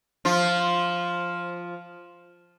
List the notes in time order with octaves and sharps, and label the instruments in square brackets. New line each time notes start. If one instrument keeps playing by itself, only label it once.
[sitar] F3 F4